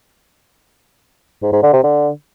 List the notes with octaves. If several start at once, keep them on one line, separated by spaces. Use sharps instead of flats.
G#2
G#2
D3
C3
D3